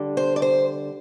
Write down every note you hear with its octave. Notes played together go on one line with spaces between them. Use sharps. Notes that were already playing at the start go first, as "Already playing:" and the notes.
Already playing: D3 G3 D4
C5
D5
C5